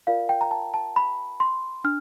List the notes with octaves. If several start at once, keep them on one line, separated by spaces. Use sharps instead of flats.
F4 A#4 D5 F5
G5
A#5
A5
A5
B5
C6
D4 F6